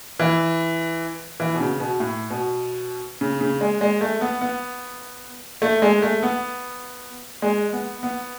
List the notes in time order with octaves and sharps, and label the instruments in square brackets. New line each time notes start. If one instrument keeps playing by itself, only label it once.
[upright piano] E3
E3
B2
C#3
B2
A2
B2
C#3
C#3
G#3
G#3
A3
B3
B3
A3
G#3
A3
B3
G#3
B3
B3